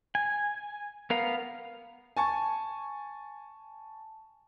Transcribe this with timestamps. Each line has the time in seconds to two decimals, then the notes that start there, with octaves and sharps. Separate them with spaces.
0.15 G#5
1.10 B3 A#4 F5
2.17 G#5 A5 C#6